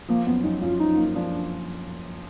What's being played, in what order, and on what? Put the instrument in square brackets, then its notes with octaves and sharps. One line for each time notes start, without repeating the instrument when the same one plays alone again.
[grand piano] F3 [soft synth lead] A#3
[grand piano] F#2 [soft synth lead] B3
[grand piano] F#2 [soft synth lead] D#4
[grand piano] F#2 [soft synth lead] F4
[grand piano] F3 [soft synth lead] D#4
[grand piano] A#3
[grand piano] F3 [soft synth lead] D4